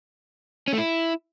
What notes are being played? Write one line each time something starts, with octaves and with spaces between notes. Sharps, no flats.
C#4
A3
E4